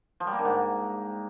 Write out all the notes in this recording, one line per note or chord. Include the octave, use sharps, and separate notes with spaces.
F3
G3
A#3
D3
G#2